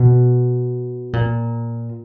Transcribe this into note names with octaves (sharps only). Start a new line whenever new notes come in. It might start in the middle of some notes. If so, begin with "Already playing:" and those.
Already playing: B2
A#2